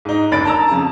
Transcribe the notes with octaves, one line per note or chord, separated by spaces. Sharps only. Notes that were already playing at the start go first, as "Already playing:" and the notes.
G#2 D#4
F#1 D2 B5 A6 D7
A5 A#5 E6
F2 C#3 A5